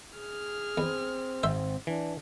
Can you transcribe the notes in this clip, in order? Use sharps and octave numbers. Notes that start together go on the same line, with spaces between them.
G#4 F6
E2 C4
G#1 C5 E5
E3 D4